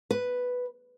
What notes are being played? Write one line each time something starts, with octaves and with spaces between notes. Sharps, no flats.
B4